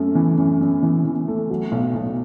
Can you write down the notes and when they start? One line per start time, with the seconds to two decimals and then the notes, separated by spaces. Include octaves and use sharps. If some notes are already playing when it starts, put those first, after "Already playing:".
Already playing: F#2 A3
0.15 E3
0.38 F#2
0.61 F#2
0.83 E3
1.05 E3
1.28 A3
1.50 F#3
1.72 B1
1.95 B1